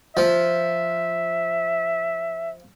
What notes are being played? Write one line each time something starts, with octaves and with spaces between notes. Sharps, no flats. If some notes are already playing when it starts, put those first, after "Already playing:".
F3 E5